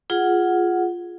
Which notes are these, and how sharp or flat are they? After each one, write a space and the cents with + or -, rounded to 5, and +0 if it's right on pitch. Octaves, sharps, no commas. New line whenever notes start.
F4 +0 G#4 +0 F#5 +0